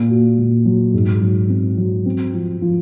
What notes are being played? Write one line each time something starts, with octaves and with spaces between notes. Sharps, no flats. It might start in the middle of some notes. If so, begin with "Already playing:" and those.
Already playing: A#2
F#4
A#2
F#3
G#2
F#3
C4
F#3
C4
F3
F3